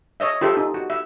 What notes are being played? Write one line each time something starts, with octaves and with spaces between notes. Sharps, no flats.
C#5 D#5 E5
F4 G4 A4 C5 E5
D#4
F#4
E5